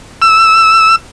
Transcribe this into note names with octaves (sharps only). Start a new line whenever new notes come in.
E6